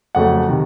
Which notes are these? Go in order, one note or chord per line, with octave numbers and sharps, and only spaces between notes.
F2 C#3 F#3 A3 F#5
C3 D#3